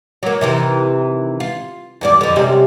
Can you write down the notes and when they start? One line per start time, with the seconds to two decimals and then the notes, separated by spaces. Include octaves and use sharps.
0.23 F#3 A#3
0.41 C3 D#3 E3
1.40 F4
2.01 E2 G2 D5
2.21 F2 D3
2.36 F#2 C3 G3